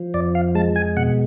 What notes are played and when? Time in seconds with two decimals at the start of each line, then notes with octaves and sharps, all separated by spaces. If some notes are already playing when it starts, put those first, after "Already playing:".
Already playing: F3
0.14 F2 D5
0.35 F5
0.55 G#3 A5
0.76 G#5
0.97 B2 F#5